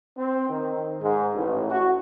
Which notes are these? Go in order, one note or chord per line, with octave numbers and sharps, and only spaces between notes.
C4
D#3
G#2
A1
F#4